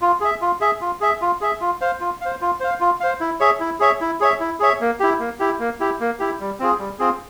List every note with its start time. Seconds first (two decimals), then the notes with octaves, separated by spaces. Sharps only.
0.02 F4
0.21 G#4 E5
0.42 F4
0.61 G#4 E5
0.81 F4
1.01 G#4 E5
1.21 F4
1.41 G#4 E5
1.61 F4
1.81 C5 F5
2.00 F4
2.21 C5 F5
2.41 F4
2.60 C5 F5
2.80 F4
3.00 C5 F5
3.20 E4
3.40 G#4 C#5 E5
3.60 E4
3.80 G#4 C#5 E5
4.01 E4
4.20 G#4 C#5 E5
4.40 E4
4.60 G#4 C#5 E5
4.81 A#3
5.00 E4 G4
5.19 A#3
5.39 E4 G4
5.59 A#3
5.80 E4 G4
6.00 A#3
6.19 E4 G4
6.40 G3
6.59 C4 F4 G#4
6.79 G3
6.99 C4 F4 G#4